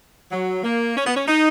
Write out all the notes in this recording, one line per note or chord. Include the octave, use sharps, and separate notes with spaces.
F#3
A#3
C#4
B3
C#4
D#4